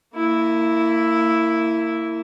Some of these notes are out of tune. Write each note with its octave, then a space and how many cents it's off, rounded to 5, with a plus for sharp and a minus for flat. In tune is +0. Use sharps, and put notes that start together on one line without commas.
A#3 -30 E4 +0